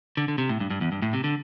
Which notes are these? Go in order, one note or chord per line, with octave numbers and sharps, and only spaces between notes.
D3
D3
C3
A2
G2
G2
E2
G2
A2
C3
D3